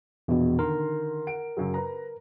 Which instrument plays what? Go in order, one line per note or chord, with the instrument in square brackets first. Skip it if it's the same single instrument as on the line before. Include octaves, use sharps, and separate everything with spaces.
[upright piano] A#1 [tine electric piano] E2 B2
[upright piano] D3 D#3 C6 [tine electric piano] A#4
[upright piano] F#5 D7
F#2 C#3 F#3
B4 A#5